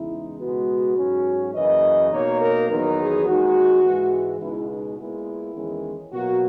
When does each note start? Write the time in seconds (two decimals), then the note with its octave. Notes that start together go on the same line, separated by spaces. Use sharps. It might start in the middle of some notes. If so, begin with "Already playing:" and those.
Already playing: E2 C#3 G#3 D#4 E4
0.40 C#2 B2 G#3 B3 F#4
0.97 G#2 F#3 C#4
1.54 F#2 C#3 E3 A#3 D#5
2.11 B2 A#3 D#4 C#5
2.39 A#4
2.68 E2 D#3 F#3 B3 D#4 A#4
2.98 G#4
3.25 D#2 D#3 G#3 D#4 F#4
3.83 G#2 E3 G#3
4.40 C#2 B2 G#3 B3 D#4 E4
4.68 D#4
4.97 A#2 G#3 B3 E4
5.55 E2 D#3 G#3 C#4
6.12 B2 F#3 A#3 F#4